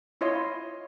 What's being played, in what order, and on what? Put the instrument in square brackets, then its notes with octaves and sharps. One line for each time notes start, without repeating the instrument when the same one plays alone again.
[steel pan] E4 F4 C#5 D#5 C6